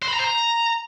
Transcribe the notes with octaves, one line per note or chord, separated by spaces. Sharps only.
C5
B5
A#5
C5
A#5